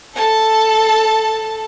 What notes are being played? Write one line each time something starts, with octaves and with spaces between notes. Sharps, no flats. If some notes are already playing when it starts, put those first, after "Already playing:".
A4 A5